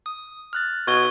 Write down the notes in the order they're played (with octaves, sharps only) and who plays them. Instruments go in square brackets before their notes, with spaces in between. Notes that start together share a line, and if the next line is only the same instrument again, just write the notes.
[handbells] D#6
F6 F#6 A6
[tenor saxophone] B2 [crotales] C#6 G#6 G7